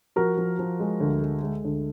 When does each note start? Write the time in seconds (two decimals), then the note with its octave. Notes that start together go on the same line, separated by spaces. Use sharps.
0.16 F3 F#4 A#4
0.37 F3
0.59 F3
0.80 G#3
1.00 D2
1.22 G#3
1.43 G#3
1.65 D2